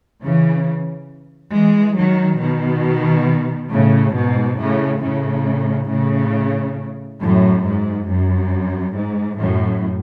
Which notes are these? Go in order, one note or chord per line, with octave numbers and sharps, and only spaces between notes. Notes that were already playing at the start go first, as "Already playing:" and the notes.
C#3 E3
E3 G#3
D#3 F#3
B2 D#3
A2 C#3
G#2 B2
A2 C#3
A2 C#3
A2 C#3
F#2 A2
G#2
F#2
G#2
F#2 A2